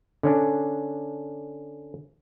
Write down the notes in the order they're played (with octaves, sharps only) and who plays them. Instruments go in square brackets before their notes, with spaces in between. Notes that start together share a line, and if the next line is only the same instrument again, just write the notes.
[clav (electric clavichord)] D3 C#4 D4